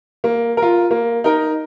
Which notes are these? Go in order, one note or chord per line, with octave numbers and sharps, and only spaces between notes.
A#3
A#4
F4
A#3
D#4 A#4